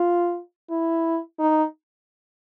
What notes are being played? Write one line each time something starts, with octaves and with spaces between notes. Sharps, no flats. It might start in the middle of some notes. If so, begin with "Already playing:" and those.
Already playing: F4
E4
D#4